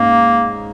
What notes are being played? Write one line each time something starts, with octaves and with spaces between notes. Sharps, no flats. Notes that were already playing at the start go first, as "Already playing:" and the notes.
Already playing: G#2 A#3 C#4